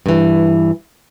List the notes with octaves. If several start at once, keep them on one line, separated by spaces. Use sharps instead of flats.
G2 E3